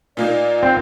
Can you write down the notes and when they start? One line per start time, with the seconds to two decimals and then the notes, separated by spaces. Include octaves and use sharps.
0.17 A#2 A#3 D#4 D5
0.63 C4